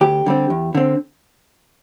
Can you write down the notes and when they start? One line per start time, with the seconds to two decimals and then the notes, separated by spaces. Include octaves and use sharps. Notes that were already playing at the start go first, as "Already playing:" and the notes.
0.01 D2 G4
0.26 D3 G3 C4
0.50 E2
0.75 D3 C4